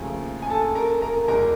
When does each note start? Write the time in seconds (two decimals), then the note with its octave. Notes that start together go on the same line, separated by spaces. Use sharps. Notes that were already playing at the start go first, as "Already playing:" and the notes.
Already playing: D#2 C#3 F3 A3 G#4
0.42 G#5
0.50 A4 A5
0.75 A#4 A#5
1.01 A#4 A#5
1.28 E2 B2 G#3 A#4 A#5